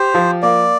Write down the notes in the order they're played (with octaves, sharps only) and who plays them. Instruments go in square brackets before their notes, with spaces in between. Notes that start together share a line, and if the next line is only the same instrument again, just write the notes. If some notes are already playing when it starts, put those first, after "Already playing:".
Already playing: [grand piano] G4 [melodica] C5
[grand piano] F3
[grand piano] A#3 [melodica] D5